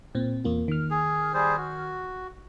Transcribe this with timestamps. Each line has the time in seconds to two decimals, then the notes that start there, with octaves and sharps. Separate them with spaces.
0.15 A#2 C4
0.44 E2 A#3 F4
0.68 D#3 F6
0.91 G#4
1.34 G3 G#4 C5
1.57 F#4